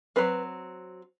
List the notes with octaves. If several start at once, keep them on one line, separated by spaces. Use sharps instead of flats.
F#3 C4 B4